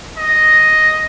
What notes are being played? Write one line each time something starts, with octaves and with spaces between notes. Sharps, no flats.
D#5